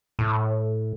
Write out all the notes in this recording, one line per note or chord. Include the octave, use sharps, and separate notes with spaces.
A2